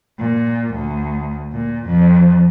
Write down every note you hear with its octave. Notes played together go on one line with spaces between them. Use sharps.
A#2
D2
A#2
F2